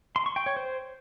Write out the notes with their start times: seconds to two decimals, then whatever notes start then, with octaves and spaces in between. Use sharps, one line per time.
0.16 C6
0.26 C#6
0.36 G5
0.46 C#5
0.57 C5